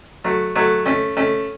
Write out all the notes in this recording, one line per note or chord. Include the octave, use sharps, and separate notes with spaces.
F#3 A3
F#3 A3
A3 C#4
A3 C#4